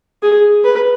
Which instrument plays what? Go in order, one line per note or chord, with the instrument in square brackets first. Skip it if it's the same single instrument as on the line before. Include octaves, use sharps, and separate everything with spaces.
[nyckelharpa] G#4
B4